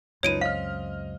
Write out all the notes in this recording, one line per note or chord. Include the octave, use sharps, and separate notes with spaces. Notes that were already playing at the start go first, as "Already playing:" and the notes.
C#2 F#2 F3 D#4 B4 C#5 D7 D#7
C4 D#5 F5 F6